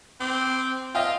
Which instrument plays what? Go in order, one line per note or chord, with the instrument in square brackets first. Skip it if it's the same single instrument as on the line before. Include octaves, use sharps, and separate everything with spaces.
[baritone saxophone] C4 [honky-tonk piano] D6
[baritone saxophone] F4 [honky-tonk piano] D#5 E5 G5